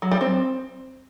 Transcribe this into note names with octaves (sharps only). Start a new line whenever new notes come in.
F#3
G3
C4